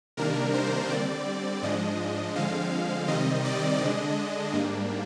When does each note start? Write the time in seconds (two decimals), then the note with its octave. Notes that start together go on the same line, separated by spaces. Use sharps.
0.17 C3 D#3 G3 A#3 D4 A#4
0.54 C5
0.90 D3 G3 C4 D5
1.63 G#2 F3 G#3 D4 D#5
2.35 D3 F3 G#3 C4 F5
3.08 C3 D#3 G3 C4 D#5
3.45 D5
3.81 D3 G#3 D4 D#5
4.53 G#2 G3 A#3 D4